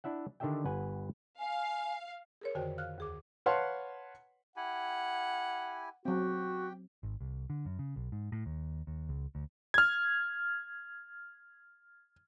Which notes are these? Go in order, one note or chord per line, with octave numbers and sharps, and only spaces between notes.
D4 E4 E5 F#5
D3 D#3 D4 G4 E5 G5
G1 B4 F#5 G#5
F5 G#5
G#4 A#4 C#5
F2 D3 D#3 F#4 C5 G5
F5 F6 F#6
D#2 G#4 D6
B4 C#5 F5 F#5 A5 C6
E4 G4 F#5 G#5
F#3 C4 F#4 G4 G5
G#1
C2
D3
F#2
C#3
B1
G#2
A2
D#2
D#2
C#2
D2
F6 G#6